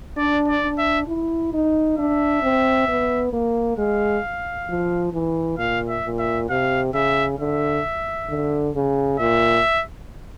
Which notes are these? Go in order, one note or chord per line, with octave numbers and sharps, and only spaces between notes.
D4 D5
D5
D4
E5
E4
D#4
D4 E5
C4
B3
A#3
G#3 F5
F3
E3
A#2 F5
E5
A#2
E5
C3 F5
C#3 E5
D3 E5
D3
C#3
A#2 E5